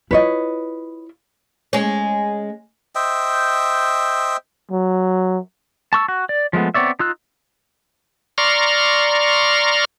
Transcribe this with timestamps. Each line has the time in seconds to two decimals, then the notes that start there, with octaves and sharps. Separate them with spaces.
0.11 E4 F4 B4 C#5 D#5
1.73 G#3 C#4
2.95 C5 D#5 E5 G5
4.71 F#3
5.93 A5 C#6 E6
6.08 F#4
6.29 D5
6.53 F3 G#3 A3 B3
6.74 B3 C4 C#5 D5 E5
6.99 D#4 F4 E6 F#6
8.38 D5 A#5 C6 C#6 F6